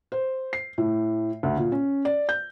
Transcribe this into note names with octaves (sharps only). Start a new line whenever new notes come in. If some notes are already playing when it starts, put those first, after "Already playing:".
C5
C7
A2
D2
A#2
C#4
D5
G6